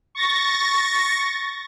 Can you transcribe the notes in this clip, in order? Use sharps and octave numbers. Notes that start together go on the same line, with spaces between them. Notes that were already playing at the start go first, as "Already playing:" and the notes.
C#6 A6 A#6